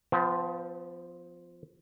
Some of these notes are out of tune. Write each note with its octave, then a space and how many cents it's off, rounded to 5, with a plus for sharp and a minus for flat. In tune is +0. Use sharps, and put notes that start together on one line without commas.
F3 +0 B3 +40